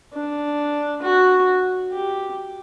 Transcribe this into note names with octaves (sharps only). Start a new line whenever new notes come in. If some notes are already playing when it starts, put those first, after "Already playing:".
D4
F#4
G4